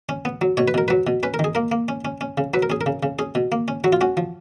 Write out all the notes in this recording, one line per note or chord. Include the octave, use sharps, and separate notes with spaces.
C#4
B3
F#3
B2 C#5
B4
B2 A#4
F#3 B4
B2
C#4 B4
A#4
D#3 G#4
A#3 A#4
A#3
C#4
C#4
C#4
C#3
F#3 B4
A#4
C#4 G#4
A#4
C#3
C#3
C#4 G#4
B2
A#3
C#4
F#3 F#4
F4
C#4 F#4
F3